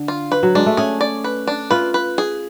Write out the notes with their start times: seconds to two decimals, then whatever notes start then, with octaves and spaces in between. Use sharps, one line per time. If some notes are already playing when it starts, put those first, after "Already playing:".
Already playing: D3
0.08 F4
0.32 B4
0.43 F#3
0.55 G#3 D4
0.66 A3
0.77 C#4 G#4
1.01 D5
1.24 B4
1.47 D4
1.71 F4 B4
1.94 B4
2.18 G#4